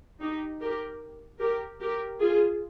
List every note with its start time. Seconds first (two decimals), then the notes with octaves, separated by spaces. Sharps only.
0.20 D#4 G4
0.61 G4 A#4
1.40 G4 A#4
1.80 G4 A#4
2.20 F4 G#4